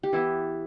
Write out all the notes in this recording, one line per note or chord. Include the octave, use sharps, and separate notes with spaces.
G4
E3 B3 E4